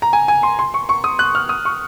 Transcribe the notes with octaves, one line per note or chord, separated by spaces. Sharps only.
A#5
G#5
G#5
C6
C6
C#6
C#6
D#6
F#6
F6
D#6
C#6